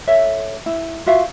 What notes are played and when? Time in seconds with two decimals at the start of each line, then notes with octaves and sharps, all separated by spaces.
0.07 A4 C#5 E5
0.66 E4
1.06 F4 F#4 E5 F5